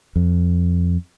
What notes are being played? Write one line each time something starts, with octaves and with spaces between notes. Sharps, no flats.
F2